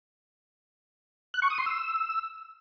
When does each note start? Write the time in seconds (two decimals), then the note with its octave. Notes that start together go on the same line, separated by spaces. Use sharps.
1.34 F#6
1.42 C#6
1.50 D#6
1.58 C6
1.66 E6